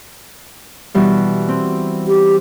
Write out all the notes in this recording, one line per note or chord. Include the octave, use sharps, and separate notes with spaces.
B2 E3 G3
C4
G4